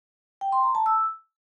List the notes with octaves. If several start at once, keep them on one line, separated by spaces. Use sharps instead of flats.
G5
C6
A#5
A5
E6